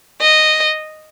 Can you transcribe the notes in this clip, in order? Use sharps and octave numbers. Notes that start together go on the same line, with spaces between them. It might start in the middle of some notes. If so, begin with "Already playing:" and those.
D#5